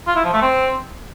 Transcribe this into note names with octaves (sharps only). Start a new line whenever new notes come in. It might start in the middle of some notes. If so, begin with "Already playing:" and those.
F4
E4
F3
A3
C4